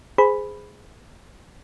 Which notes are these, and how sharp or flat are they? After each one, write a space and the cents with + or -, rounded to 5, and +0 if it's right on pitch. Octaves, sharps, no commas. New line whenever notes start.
G#4 +0 C5 -25 B5 +0